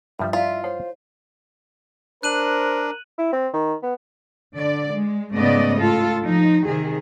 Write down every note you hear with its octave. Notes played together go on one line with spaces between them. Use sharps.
G2 F3 G3 E5
E4 F4 D5 E5 F5
C5 C#5 F#5
D4 A#4 C5 F#6 D#7 F#7
E4
C4
D#3
B3
D3 D5
G#3
G#2 C#3 A3 B3 D5 D#5
A2 F4 A4
F3 D#4
C3 D#3 G#4